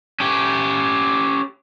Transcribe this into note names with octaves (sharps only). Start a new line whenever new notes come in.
C#4 G4